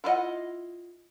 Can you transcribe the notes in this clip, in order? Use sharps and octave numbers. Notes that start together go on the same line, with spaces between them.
E4 F4 B4 D#5 F#5